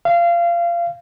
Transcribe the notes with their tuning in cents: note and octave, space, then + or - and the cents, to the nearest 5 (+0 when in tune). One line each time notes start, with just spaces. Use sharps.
F5 -25